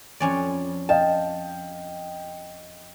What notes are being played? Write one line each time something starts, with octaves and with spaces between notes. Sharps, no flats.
F2 C#4 D5
D#5 F5 G5 A5